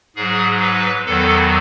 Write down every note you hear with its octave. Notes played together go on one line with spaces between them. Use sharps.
G#2 F#3 G#4
B4
E2 D#3 F#3 A4